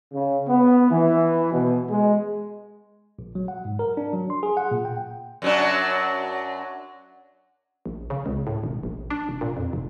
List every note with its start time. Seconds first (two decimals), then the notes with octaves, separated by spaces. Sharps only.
0.12 C#3
0.48 B3
0.91 E3
1.52 B2
1.89 G#3
3.19 A#1
3.35 F#3
3.48 F#5
3.65 G#2
3.79 A#4
3.97 D4
4.13 F#3
4.30 C6
4.43 G#4
4.57 F#5
4.71 A#2
4.85 G5
5.42 F#2 F#3 D4
7.86 A#1
8.10 C#3
8.26 C#2
8.47 A2
8.64 E1
8.83 A#1
9.10 D4
9.29 F1
9.41 A#2
9.57 F2
9.73 F1